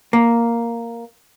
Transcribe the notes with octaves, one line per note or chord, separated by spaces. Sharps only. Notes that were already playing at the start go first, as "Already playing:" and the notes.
A#3